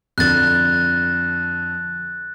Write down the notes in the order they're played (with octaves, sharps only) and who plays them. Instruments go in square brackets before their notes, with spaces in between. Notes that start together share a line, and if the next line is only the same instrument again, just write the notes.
[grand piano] F2 D3 [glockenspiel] F#6 A6